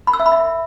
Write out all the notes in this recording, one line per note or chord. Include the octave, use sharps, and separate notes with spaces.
B5
E6
E5
B5
E5